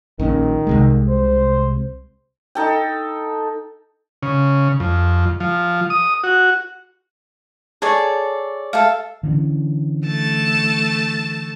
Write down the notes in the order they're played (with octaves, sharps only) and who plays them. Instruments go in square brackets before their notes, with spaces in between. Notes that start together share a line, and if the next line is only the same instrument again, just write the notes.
[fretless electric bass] A#1 A#2 C#4 [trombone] D#3
[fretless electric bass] C2 C3 G#3
[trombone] C5
[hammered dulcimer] D#4 A4 G5
[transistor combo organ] C#3
F2
F3
D#6
F#4
[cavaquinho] G#4 A4 C#5 D5
A4 E5 F5
[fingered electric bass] D3 E3 C#4
[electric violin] A3 A5